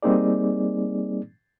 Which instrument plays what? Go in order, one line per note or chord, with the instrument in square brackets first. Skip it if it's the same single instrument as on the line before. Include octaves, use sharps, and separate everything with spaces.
[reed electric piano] G3 A#3 C4 D#4 G#4 D5